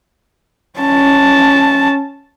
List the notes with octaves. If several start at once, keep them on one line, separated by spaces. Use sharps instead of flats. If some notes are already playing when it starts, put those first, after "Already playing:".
C#4 A5